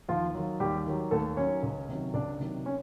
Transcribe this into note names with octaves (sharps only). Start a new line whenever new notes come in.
D#2 F3 F4
D#3 F#3
D#2 G3 G4
D#3 F#3
D#2 A3 A4
D#3 F#3 C#4 C#5
C#2
C3 D#3 F#3
C#2 D4 D5
C3 D#3 F#3
C#4 C#5